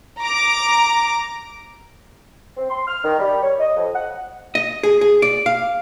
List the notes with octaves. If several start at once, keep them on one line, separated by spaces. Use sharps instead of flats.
A#5 D6
C4
C6
F6
D#3
G3
C#5
D#5
F2
F#5
D#5
G#4
G#4
D5
F5